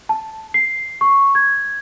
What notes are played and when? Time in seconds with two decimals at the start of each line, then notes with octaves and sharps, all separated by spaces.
0.09 A5
0.54 C7
1.01 C#6
1.35 G#6